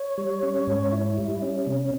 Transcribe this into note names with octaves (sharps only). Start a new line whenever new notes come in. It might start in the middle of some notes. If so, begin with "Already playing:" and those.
Already playing: C#5
G3
C#4
G#2
E4
G3
C#4
C3